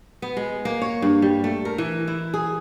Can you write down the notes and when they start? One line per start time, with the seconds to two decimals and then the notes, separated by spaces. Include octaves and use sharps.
0.22 B3
0.37 G#3
0.65 A#3
0.82 C#5
1.02 G2
1.22 G3
1.44 A3
1.65 A#4
1.78 E3
2.08 E4
2.34 G#4